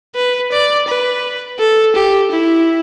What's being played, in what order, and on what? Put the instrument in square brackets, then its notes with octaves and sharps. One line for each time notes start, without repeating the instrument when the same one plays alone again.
[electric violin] B4
D5
B4
A4
G4
E4